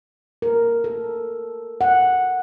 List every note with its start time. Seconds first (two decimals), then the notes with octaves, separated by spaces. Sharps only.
0.42 A#4
0.84 A4
1.81 F#5